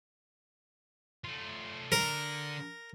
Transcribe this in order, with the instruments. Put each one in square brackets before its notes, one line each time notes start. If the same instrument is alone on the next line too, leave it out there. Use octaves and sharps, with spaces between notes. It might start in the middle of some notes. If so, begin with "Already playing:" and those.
[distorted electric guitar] A3 F4
[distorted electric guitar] D3 [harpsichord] A#4